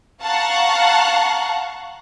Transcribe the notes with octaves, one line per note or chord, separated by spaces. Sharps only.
F5 F#5 A5 A#5 C#6 F#6